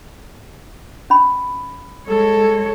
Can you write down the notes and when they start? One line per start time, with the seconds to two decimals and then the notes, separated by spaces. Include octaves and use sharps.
1.10 C#4 B5
2.08 G#3 A4 C#5